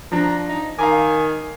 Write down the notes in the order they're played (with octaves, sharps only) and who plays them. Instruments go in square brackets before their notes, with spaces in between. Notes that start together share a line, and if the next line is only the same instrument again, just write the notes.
[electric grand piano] F3 D4 [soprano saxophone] A#5
[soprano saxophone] D#4
[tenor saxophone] D#3 [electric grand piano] F5 A#5 D6 [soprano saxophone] G#5